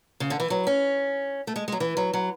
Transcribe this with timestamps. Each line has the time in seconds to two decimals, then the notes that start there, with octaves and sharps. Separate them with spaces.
0.20 C#3
0.30 D3
0.40 E3
0.50 F#3
0.67 C#4
1.47 A3
1.56 G#3
1.68 G#3
1.72 F#3
1.80 E3
1.97 F#3
2.13 F#3